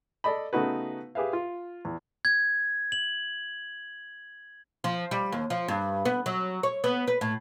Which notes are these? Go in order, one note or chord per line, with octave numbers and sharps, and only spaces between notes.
A4 D5 D#5 B5
C#3 A3 B3 D#4 F#4 B4
G4 G#4 B4 E5 F5
F4
E2
G#6
F#7
F3
G3
D#2
F3
G2
B3
F#3
C#5
B3
B4
A2